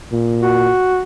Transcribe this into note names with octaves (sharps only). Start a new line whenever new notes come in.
A#2
F#4